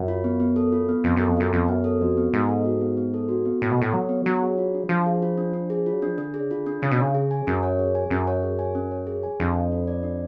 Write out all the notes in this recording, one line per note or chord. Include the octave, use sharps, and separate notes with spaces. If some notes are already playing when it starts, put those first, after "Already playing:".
Already playing: F#2
F4
B3
B3
A4
F4
B3
F2 B3
F#2 A4
F2
F#2 F4
F2 B3
F#2 B3
A4
F2 F#4
B3
G#2 B3
A4
F#4
B3
B3
A4
F#4
B3
A2 B3
B2
A2 A4
F#3 F#4
B3
F#3 D4
G#4
F4
D4
F3 D4
G#4
F4
D4
D4
G#4
F4
F#3
F3 D4
D3 D4
G#4
C#3
D3 F4
D4
C#3 C#4
B2
C#3 C#5
G#4
G#5
F#2 C#4
C#5
G#4
G#5
F#2 C#4
C#5
G#4
G#5
C#4
C#5
G#4
G#5
F2 D4
A4
F4
D5
D4